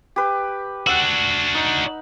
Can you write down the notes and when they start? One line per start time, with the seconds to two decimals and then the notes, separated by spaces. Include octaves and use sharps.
0.16 G4 B4
0.87 D4 F#4 F#5 E6
1.55 D#4